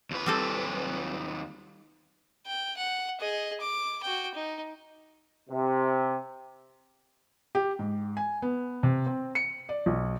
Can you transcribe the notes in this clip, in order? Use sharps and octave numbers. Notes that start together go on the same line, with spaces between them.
D#2 B4
G3 C4 A4
G5
F#5
G#4 D#5
D6
F#4 G5
D#4
C3
G4
G#2
G#5
B3
C3
C4
C#7
D5
B1